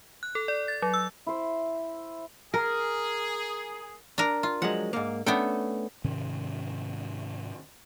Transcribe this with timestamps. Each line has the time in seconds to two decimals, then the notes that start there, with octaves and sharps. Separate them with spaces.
0.23 F#6
0.35 A4
0.48 D5
0.68 A6
0.82 F#3
0.94 E6
1.27 E4 C5
2.54 G#4 A#4
4.18 D4 A#4
4.43 F4
4.62 F3 F#3 G#3 F#5
4.93 G#2 A#3
5.26 A3 B3 C#4 D4 G5
6.04 G#2 C3 D#3 C#4